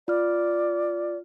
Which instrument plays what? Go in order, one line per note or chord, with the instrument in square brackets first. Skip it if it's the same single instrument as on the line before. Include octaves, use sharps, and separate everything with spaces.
[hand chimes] F4 F6 [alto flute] D5